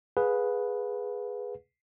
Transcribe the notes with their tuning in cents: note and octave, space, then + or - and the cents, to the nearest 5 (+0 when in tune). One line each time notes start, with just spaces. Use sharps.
G#4 +0 B4 +0 F5 +45